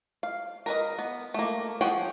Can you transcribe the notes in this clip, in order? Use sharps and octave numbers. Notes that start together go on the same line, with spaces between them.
F5
A#4 B4 D#5
B3
A3 A#3
F3 G#4 C#5 F#5 G5